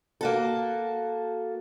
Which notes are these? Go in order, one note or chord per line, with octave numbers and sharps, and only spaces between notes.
A#3 F#4 A4